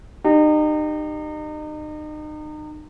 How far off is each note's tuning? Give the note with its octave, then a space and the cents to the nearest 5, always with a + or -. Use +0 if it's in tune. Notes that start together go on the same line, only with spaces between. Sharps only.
D#4 -35 G4 +0